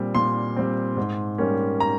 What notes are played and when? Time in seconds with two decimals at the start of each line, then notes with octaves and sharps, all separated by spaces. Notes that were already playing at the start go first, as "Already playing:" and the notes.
Already playing: A#2 G3 C4
0.15 A#2 C6
0.56 G3 C4
0.97 G#2
1.38 G3 A#3 C#4
1.80 A#5